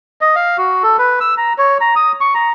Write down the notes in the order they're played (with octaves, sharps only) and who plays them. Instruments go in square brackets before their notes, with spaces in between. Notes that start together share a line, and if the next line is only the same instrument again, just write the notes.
[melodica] D#5
F5
F#4
A4
B4
E6
A#5
C#5
A#5
D#6
C#6
A#5